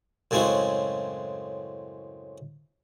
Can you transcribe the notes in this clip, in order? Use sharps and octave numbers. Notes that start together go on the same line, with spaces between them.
F#2 A2 C#3 G#3 C4 F#4